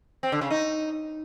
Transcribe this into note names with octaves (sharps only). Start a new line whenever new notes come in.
C4
D3
C#3
D#4